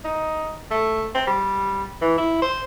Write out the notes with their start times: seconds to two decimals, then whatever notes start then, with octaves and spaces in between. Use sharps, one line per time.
0.05 D#4
0.71 A3
1.15 C4
1.27 G3
2.02 E3
2.18 E4
2.42 C5